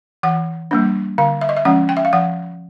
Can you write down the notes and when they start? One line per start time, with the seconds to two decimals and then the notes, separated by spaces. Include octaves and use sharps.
0.23 E3 F#5
0.71 G3 A#3 D4
1.18 D3 F5
1.41 E5
1.49 D#5
1.57 E5
1.65 F3 G#3 C#4 F#5
1.89 G5
1.97 E5
2.05 F5
2.13 F3 F#5